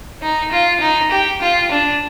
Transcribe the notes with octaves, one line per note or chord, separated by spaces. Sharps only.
D#4
F4
D#4
G4
F4
D4